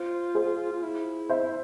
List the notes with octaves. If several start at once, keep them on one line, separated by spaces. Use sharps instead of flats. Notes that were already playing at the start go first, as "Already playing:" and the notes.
Already playing: F4 C5
G#4 C5
F4
E4
C5 E5